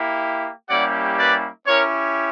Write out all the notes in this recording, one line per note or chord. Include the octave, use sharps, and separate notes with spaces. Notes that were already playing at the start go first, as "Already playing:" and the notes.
Already playing: A#3 E4 G4
G3 A#3 C#4 E4 G4 D5 F#5
B4 D5
C#4 E4 G4 A#4 C#5